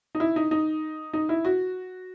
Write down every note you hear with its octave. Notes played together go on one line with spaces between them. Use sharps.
D#4
E4
D#4
D#4
D#4
E4
F#4